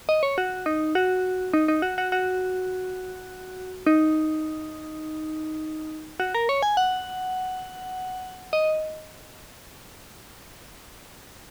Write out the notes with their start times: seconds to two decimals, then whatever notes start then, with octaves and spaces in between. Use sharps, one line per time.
0.09 D#5
0.23 C#5
0.38 F#4
0.66 D#4
0.95 F#4
1.53 D#4
1.68 D#4
1.82 F#4
1.98 F#4
2.12 F#4
3.87 D#4
6.20 F#4
6.35 A#4
6.49 C#5
6.63 G#5
6.77 F#5
8.53 D#5